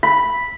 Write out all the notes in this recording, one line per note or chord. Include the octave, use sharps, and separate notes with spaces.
B5